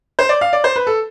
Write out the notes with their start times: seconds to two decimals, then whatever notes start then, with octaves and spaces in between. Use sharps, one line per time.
0.19 C5
0.29 D5
0.41 F5
0.53 D5
0.64 C5
0.76 B4
0.87 A4